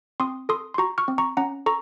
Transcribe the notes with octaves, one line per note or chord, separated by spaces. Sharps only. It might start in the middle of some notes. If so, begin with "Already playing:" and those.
C4 C6 D#6
A4 C6 D#6
C6
F#4 A#5 C#6
C#6 F6
C4
A#5 C#6
C#4 F#5 A#5
A4 A#5 C#6